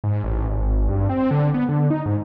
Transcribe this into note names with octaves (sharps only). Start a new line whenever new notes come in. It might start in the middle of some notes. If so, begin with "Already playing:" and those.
G#2
A1
G#1
G2
C4
D3
B3
D3
D#4
G#2